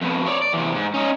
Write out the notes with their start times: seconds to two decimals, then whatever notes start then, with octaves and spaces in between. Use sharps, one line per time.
0.01 F2 B2
0.26 C#5 D5
0.42 D5
0.54 E2 C3
0.75 G#2
0.94 C#4 D#4